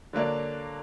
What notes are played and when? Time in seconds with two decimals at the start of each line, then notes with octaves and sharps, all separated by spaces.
0.13 D3 F#3 A#3 D4